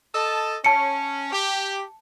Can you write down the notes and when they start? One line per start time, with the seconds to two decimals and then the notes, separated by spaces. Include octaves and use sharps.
0.15 A4 D#5 A5
0.65 C#4 A5 C#7
1.32 G4